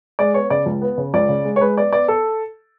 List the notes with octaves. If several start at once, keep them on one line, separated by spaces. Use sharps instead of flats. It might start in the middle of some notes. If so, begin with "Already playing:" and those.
G#3 D5
B3 C#5
C#3 D5
C#2
B3
C#3
C#2 D5
C#3
G#3
C#5
G#3 B4
B3 D5
B3 D5
A4